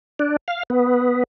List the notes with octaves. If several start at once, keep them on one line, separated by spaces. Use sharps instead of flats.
D4
F5
B3